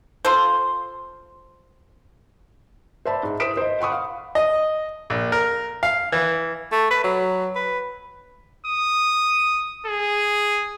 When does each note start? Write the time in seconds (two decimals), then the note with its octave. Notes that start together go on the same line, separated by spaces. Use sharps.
0.25 F4 A4 C5
3.05 C5 D5 E5 A5 B5
3.23 G#2
3.40 E4 C5 D#6 B6 D7 E7
3.57 C5 D#5
3.80 F#5 B5 C#6 D#6
3.92 F5
4.35 D#5
5.10 A#1
5.32 A#4
5.83 F5
6.12 E3
6.72 A3
6.91 B4
7.04 F#3
7.56 B4
8.66 D#6
9.86 G#4